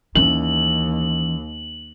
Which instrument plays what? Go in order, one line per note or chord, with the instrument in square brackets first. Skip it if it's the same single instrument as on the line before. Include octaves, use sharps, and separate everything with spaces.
[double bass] D#2 [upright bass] E3 C#4 [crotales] F#7